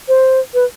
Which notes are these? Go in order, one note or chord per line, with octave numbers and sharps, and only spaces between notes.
C5
B4